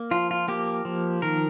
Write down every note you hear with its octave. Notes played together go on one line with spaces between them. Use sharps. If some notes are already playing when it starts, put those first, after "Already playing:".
Already playing: A#3
F3 F4
F4
A#3 G4
F3
D#3 A#4